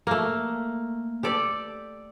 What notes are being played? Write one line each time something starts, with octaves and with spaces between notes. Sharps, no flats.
A3 A#3
G4 A4 D5